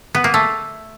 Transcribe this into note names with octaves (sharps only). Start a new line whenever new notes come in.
B3
A#3
A3